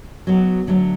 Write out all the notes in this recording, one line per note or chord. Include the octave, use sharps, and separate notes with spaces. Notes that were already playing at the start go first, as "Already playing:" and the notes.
F#3 B3 F#4
D3 F#3 A3